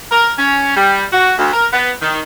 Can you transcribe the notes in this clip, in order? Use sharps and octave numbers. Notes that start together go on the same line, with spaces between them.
A#4
C#4
G3
F#4
D2
A#4
B3
D#3